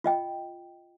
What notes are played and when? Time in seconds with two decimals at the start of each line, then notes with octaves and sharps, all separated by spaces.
0.04 F4 D#5 G5